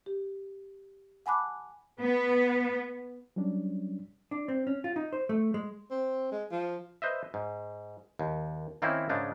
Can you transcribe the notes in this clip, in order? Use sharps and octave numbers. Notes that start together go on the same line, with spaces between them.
G4
F#5 G#5 A5 B5 D6 F#6
B3
F#3 G3 C#4 D4
D4
C4
C#4
F4
D#4
C5
A3
G#3
C4
G#3
F3
B4 C5 D#5 E5
G#2
D#2
D#3 A#3 C4 C#4 E4
G#2 C#3 G#3 D4 D#4